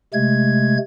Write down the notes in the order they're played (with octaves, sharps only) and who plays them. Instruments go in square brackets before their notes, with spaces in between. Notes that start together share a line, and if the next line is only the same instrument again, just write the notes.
[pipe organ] C3 G#3 A3 G#6